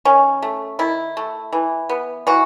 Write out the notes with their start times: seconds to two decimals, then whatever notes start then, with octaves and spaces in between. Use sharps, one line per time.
0.05 D#3 C#4
0.42 A3
0.79 D#3 E4
1.17 A3
1.53 E3
1.89 B3
2.27 E3 F#4